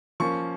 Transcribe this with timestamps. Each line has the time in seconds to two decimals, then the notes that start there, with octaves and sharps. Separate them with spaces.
0.20 F3 A#3 C#4 C#6